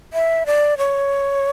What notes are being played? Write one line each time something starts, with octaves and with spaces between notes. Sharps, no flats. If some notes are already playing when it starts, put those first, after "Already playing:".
E5
D5
C#5